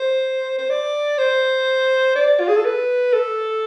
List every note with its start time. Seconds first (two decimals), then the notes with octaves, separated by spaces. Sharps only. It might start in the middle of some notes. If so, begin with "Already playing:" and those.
Already playing: C5
0.58 C5
0.70 D5
1.18 C5
2.15 D5
2.40 F4
2.48 G#4
2.56 A4
2.65 B4
3.13 A4